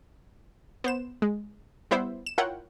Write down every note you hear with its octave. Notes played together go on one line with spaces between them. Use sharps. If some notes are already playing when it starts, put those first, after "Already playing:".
B3 C5 E7
G#3
G3 B3 E4 C5 E5
E7
E4 F4 A#4 C#5 F#5 G5